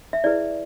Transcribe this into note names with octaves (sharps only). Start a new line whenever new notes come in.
E5
E4 G#4 B4 D5